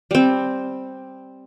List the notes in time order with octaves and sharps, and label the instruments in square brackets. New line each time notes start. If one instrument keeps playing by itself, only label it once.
[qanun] G3 C4